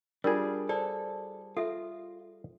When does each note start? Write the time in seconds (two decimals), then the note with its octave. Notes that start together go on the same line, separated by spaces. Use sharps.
0.24 G3 D4 F4 G#4 A#4
0.69 A4 C5 D5
1.57 F4 A4 E5